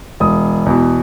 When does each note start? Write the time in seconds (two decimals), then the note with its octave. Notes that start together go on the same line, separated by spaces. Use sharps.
0.20 E1 D#6
0.66 E2 B2